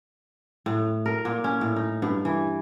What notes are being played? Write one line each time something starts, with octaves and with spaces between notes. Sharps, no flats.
A2
A#4
A#2
C#4
A2
D#4
G2
E3